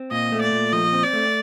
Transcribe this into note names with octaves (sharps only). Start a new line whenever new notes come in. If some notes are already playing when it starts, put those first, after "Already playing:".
Already playing: C4
A#2 D#5
A3
D5
A#2
F3 D#5
C4
D5
A3